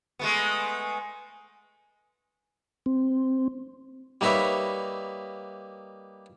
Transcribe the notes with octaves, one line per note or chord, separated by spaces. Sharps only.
G#3 A3 B3
C4
G3 A#3 D#4 B4 C#5 E5